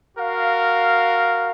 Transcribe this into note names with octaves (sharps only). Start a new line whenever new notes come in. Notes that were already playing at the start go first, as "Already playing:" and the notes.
F#4 A#4 F5